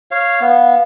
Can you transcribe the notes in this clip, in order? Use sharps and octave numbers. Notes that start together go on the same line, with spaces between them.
C#5 F5
B3 F5